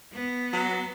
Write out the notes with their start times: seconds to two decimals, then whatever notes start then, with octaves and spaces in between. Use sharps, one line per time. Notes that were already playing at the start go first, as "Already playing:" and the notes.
0.14 B3
0.53 F#3